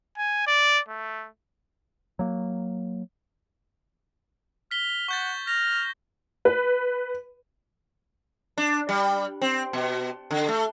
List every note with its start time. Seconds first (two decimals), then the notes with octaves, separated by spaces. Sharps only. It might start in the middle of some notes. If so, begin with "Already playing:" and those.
0.17 G#5
0.47 D5
0.88 A3
2.19 F#3 A#3
4.71 F6 B6 G7
5.08 F#5 C#6 G6 A6
5.47 F6 A#6
6.45 B4
8.58 D4
8.89 G3
9.42 C4
9.73 B2
10.31 D3
10.48 A3